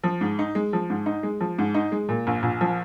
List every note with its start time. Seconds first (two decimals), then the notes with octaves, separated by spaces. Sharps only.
0.03 F3
0.21 G#2
0.39 D#4
0.55 G#3
0.73 F3
0.90 G#2
1.06 D#4
1.23 G#3
1.41 F3
1.59 G#2
1.74 D#4
1.92 G#3
2.09 A#2
2.27 A#1
2.43 A#1
2.61 F3